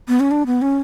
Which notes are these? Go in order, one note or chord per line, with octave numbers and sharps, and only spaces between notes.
B3
C#4
D4
B3
C#4